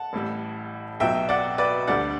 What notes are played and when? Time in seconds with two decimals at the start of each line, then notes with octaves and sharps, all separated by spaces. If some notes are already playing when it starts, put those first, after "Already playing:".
Already playing: F#5 A5
0.13 A1 A2 G3
1.00 B1 B2 F#3 E5 G5
1.29 D5 F#5
1.58 B4 D5
1.87 D2 D3 G3 D5 F#5